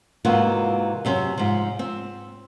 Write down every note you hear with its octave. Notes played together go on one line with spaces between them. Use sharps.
G#2 C3 E3 A#3 F4 F#4
F#2 C3 C#4
G#2 F3
C4